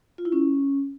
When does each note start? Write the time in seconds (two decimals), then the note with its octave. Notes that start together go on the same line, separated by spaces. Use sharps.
0.18 F4
0.25 E4
0.32 C#4